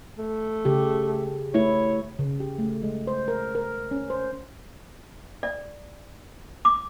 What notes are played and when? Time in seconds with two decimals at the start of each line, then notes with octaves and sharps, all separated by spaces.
0.18 A3
0.65 C#3 G4
1.54 A3 E4 C#5
2.19 C#3
2.40 G4
2.59 A3
2.83 G#3
3.07 C5
3.28 A#4
3.55 A#4
3.91 C#4
4.10 C5
5.43 D5
6.65 D6